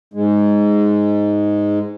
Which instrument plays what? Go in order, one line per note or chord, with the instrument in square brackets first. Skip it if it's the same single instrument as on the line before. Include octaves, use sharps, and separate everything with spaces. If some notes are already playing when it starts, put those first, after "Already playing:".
[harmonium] G#2 G#3